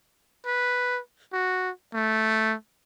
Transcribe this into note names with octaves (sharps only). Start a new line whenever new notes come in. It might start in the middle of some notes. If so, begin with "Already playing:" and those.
B4
F#4
A3